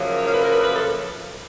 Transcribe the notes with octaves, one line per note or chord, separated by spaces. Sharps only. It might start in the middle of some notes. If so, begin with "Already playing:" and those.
Already playing: F#2 C#3 F3 A#3
C#5
F5
B4
A#4
B4
B4
A4